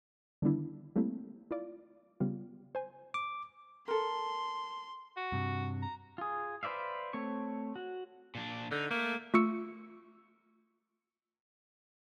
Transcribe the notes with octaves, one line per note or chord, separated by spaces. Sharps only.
D3 D#3 G3 B3 D4 E4
G3 A3 A#3 C4 E4
E4 F4 D5
C#3 G3 B3 F4
C5 G#5
D6
A4 A#4 C6
F#4
G2 C3
A#5
F4 G#4
B4 C5 D5 E5 F5
A3 C4 C#5 C#6
F#4
A#2 D4
D3 D#4
A3 A#3
A3 F4 C#6 E6 C#7